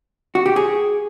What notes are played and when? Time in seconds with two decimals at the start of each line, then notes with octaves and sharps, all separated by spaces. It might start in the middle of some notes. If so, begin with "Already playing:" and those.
0.35 F#4
0.46 G4
0.56 G#4